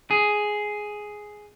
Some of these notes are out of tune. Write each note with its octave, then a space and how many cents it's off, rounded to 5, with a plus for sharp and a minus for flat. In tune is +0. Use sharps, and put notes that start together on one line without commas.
G#4 +5